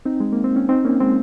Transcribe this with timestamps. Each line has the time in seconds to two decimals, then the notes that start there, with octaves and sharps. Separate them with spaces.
0.05 C4 D#4
0.20 G#3
0.32 A#3
0.44 C4
0.56 C#4
0.69 C4 D#4
0.85 A#3 C#4
1.00 G#3 C4